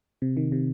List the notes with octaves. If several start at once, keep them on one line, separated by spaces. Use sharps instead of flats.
C3
D#3
C3